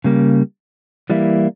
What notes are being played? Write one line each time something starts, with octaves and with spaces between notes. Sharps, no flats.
C#3 G3 A#3
E3 G3 A#3 E4